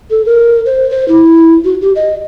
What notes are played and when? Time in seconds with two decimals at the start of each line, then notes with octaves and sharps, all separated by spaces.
0.11 A4
0.26 A#4
0.66 C5
0.91 C5
1.08 E4
1.65 F#4
1.81 G4
1.96 D#5